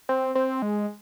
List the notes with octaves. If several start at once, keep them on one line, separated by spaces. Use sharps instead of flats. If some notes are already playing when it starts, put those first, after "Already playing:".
C4
C4
G#3